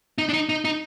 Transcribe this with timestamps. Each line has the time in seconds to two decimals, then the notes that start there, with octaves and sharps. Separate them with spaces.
0.18 D#4
0.29 D4
0.33 D#4
0.49 D#4
0.65 D#4